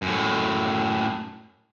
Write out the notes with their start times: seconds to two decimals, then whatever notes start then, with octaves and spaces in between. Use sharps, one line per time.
0.02 F#2 A2